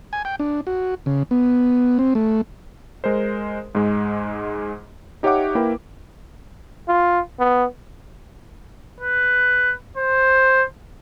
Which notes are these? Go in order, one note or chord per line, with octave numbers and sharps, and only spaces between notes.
G#5
G5
D4
F#4
C#3
B3
C4
A3
G#3 A#4 C5
G#2 G#3
D#4 G4 C#5 E5 F#5 D6
A#3 E4 A#4 B4 G5
F4
B3
B4
C5